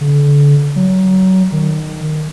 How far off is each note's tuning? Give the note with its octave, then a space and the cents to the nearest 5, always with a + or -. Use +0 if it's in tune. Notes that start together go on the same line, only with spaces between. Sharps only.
D3 -35
F#3 +25
D#3 -15